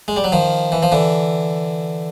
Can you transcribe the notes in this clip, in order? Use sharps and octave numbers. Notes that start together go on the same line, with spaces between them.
G#3
G3
F#3
D#3 F3
E3
F3
D3 E3